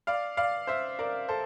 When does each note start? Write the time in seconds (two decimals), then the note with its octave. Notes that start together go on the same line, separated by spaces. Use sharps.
0.07 D5 F5
0.37 D5 F5
0.67 C5 E5
0.99 A#4 D5
1.28 A4 C5